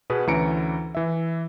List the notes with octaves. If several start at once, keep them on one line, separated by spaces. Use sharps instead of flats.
B2 B3 G#4 B4
D2 E3 C#4 A#5 C#7 D7
E3 E5